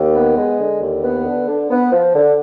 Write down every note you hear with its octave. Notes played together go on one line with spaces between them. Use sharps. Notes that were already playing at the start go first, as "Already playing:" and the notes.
Already playing: D#2
B3
G#3
D3
D#2
B3
D3
D3
B3
F3
D3